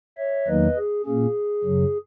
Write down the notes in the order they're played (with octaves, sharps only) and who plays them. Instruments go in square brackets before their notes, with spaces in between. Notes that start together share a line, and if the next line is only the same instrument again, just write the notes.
[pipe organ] C#5 E5
E2 D#3 F#3 A#3 D#4 B4 D#5
G#4
A#2 A#3 C#4 G#4
F#2 C#3 F#3